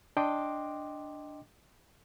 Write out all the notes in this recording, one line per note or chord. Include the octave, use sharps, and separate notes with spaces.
D4 D#5 G5 C6 D6